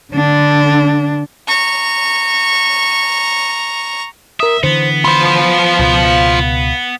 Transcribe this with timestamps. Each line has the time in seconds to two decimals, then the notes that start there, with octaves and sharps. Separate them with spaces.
0.12 D3 D4
1.48 A#5 C#6
4.40 A#4 E5 D#6
4.63 D3 E3 B3 C5
5.05 F4 C5 B5
5.79 C#2 B2
6.05 F5